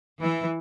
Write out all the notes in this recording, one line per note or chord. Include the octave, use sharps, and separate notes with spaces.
E3